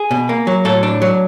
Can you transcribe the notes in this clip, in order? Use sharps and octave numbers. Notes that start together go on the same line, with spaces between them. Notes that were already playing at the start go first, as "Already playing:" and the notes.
Already playing: G#4
B2
A#3
F#3
A2 A4
D4
F#3